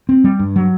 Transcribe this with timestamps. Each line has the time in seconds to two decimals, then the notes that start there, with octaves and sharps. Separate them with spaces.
0.09 C4
0.24 G3
0.39 G2
0.56 F#3